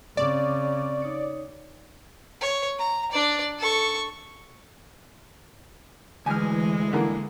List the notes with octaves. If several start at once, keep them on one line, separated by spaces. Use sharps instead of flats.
C#3 C4 D5 C#6 D6
D#4 C#5
C#5
A#5
D4 D5
A4 C#6
D2 E3 G#3 G#5 F6
D3 E3 A#3